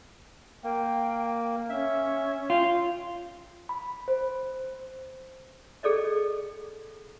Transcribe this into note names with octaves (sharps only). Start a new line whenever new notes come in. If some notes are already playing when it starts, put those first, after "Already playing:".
A#3 G5
C#4 E5
F4 G5
B5
C5
G#4 A4 D5 D#5